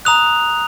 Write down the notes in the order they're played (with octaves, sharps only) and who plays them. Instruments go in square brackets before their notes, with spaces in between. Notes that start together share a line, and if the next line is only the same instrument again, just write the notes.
[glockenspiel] A#5 D#6 F#6 F7